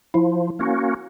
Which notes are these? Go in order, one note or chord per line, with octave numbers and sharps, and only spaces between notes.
F3 E4
A#3 C#4 F#4